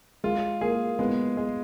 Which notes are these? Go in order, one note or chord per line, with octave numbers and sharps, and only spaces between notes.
G#3 F4
A#3 G#4
G#3 B3
G#3